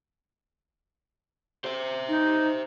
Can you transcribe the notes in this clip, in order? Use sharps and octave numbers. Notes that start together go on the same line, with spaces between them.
C5 E5
D#4